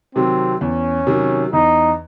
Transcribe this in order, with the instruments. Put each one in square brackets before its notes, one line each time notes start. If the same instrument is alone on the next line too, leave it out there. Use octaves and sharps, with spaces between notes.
[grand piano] C3 D#3 F#3 [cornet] C4
[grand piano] E2 [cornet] C#4
[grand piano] C3 D#3 F#3
[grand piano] E2 [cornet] D#4